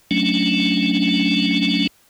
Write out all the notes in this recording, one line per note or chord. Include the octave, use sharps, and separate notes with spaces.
F#3 A3 C#4 D4